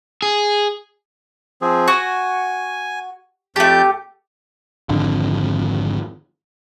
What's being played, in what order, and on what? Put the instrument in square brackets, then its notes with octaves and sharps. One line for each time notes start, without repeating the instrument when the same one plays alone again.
[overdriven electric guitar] G#4
[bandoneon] F3 C4 G#4
[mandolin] F#4 [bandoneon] G#5
[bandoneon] F2 A5 G6 [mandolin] A3 G4
[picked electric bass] G#1 F2 D3